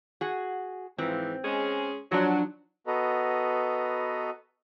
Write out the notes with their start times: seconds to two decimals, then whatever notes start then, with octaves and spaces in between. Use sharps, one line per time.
0.21 F#4 G#4
0.98 G#2 E3 F3 C4
1.44 G#3 C#4 G#4
2.12 F3 F#3 D4 F#4
2.87 B3 F#4 A4 B4 D#5 A#5